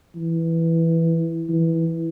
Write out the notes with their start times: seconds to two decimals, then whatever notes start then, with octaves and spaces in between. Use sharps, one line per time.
0.16 E3
1.49 E3